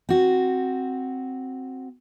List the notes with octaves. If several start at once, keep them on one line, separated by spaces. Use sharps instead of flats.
C4 F#4